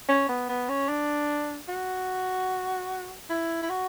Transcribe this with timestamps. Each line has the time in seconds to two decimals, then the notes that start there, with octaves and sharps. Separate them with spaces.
0.09 C#4
0.29 B3
0.49 B3
0.69 C#4
0.88 D4
1.69 F#4
3.30 E4
3.62 E4
3.69 F#4